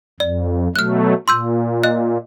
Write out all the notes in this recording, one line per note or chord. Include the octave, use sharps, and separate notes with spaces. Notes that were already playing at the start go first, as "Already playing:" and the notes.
F2 D5
B2 F#3 A3 F6 F#6
A#2 C6 E6 G6
D#5 F#6